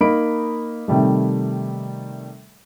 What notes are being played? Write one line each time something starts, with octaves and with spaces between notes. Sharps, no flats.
A#3 D#4 B5 D7
C3 D#3 G3 A3